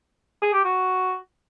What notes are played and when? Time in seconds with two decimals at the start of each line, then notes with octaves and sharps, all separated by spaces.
0.42 G#4
0.53 G4
0.65 F#4